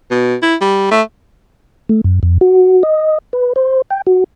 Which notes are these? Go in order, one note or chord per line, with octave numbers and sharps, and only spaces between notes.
B2
E4
G3
A3
A3
F#2
F2
F#4
D#5
B4
C5
G5
F#4